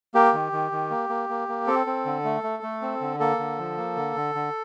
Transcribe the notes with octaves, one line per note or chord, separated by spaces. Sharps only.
A#3 G4
D#3
D#3
D#3
A#3
A#3
A#3
A#3
C4 A4
C4
D3
A3
A3
A3
C4
D3
A#3 A4
D3
F3
A#3
D3
D3
D3